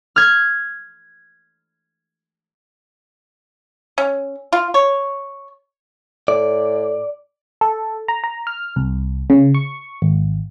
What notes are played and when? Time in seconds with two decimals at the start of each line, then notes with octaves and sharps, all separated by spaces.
0.16 F6 G#6
3.98 C#4
4.53 F4
4.74 C#5
6.28 A2 D5
7.61 A4
8.08 A#5
8.24 A#5
8.47 F6
8.76 C2
9.30 C#3
9.55 C#6
10.02 G#1